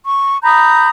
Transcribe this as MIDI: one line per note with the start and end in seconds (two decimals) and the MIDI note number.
0.04 0.37 85
0.44 0.89 82
0.44 0.89 83
0.44 0.89 87
0.44 0.89 91